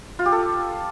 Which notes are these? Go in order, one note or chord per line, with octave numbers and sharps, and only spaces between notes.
F4
G4
A4